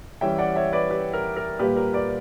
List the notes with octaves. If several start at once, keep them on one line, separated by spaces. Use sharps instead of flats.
E3 G3 C#4 E5 G5
D5 F#5
C#5 E5
B4 D5
G4 B4
A#4
A#4
A#2 G3 A#3 G4 B4
A#4
B4 D5